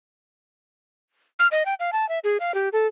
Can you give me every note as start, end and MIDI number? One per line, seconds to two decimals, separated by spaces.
1.39 1.47 89
1.51 1.63 75
1.66 1.74 79
1.80 1.91 77
1.93 2.08 81
2.09 2.19 76
2.24 2.37 68
2.40 2.54 77
2.54 2.69 67
2.73 2.87 69